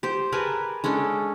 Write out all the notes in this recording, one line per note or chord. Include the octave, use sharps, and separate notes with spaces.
G4 C5
G#4 A#4 B4 A5
G#3 C#4 D4 A4